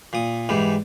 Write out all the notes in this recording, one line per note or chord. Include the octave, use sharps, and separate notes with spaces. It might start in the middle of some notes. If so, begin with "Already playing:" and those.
A#2 D#6
G#2 E3 G3